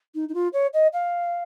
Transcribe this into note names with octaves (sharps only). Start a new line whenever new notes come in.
D#4
D#4
F4
C#5
D#5
F5